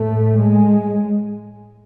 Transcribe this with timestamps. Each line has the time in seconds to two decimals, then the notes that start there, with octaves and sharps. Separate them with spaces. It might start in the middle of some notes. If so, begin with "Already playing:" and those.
Already playing: A2 A3
0.37 G#3